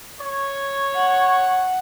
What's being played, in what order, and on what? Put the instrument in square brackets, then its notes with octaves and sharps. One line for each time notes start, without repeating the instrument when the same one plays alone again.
[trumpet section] C#5
[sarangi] F#5